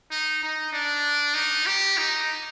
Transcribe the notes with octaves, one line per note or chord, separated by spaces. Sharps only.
D#4
D#4
D4
D#4
G4
D#4